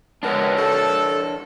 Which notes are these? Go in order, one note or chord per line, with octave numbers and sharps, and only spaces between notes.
G#3 B3 D4 A#4 C#5
A4